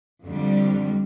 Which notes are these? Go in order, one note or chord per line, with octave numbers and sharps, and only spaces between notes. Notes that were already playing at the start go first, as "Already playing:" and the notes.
F2 D3 G3